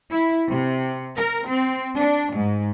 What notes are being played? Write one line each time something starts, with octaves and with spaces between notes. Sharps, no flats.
E4
C3
A#4
C4
D4
G#2